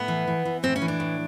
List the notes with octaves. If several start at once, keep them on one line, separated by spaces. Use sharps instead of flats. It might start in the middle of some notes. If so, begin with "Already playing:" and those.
Already playing: A2 B3
E3
E3
E3
A2 C4
C#4
E3
D4
A2